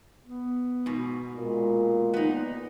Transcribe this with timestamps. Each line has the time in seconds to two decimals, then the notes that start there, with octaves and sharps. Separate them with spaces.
0.24 B3
0.86 G#2 B2
1.36 A#2 G#3
2.14 B3 D#4